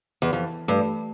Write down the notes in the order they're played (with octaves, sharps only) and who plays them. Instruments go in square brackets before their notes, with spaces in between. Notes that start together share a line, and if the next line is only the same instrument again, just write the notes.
[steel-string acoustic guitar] E2
[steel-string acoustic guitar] F2 [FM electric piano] E3
[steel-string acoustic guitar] G2 [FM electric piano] A3